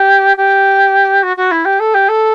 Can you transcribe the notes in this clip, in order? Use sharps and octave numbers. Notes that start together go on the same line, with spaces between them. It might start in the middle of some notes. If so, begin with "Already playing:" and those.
Already playing: G4
G4
F#4
F#4
E4
G4
A4
G4
A4